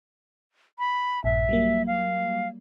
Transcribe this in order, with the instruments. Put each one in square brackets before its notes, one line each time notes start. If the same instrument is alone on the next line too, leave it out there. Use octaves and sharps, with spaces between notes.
[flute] B5
[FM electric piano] A#1 G2 [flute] E5
[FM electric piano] F#3 G3 A#3
[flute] F5